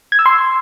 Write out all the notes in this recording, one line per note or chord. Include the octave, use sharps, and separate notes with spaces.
G#6
E6
C6